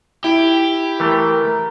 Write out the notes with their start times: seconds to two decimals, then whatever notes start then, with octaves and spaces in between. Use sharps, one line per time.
0.24 E4 G4 D7
1.00 E3 A3 A#4